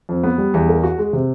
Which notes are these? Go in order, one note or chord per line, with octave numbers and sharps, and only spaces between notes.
F2
B3
G3
E2
A#4
F#4
G#3
C3